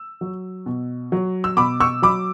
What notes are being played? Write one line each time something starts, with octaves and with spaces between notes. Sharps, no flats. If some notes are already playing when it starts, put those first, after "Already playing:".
Already playing: E6
F#3
B2
F#3
E6
B2 B5 D6
C#6 E6
F#3 B5 D6